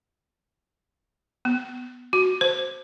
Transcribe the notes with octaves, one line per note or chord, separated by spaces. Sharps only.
B3
F#4
C5